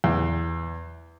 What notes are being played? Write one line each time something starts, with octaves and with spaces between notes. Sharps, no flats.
E2